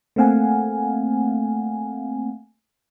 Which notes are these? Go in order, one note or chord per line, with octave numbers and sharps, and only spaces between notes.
A3 A#3 C4 F5 F#5 G#5